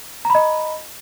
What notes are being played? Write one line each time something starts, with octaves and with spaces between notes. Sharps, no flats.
D#5 A#5 B5